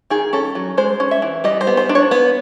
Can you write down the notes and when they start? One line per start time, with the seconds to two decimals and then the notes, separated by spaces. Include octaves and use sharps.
0.10 D#3 G#4
0.33 C#4 A4
0.55 F#3
0.77 G#3 C5
1.00 C#4
1.11 E5
1.22 E3
1.44 G3 D#5
1.61 C5
1.67 B3
1.77 C5
1.89 D4
1.95 C#5
2.11 B3